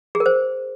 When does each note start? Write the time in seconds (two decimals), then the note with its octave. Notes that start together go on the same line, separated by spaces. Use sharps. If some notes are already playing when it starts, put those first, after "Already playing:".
0.15 G#4
0.20 A#4
0.26 C5